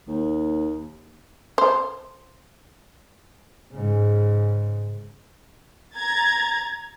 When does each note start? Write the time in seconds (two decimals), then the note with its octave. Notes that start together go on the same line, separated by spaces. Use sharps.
0.07 D#2
1.58 C5
3.72 G#2 C#3
5.95 A#5 G#6 A6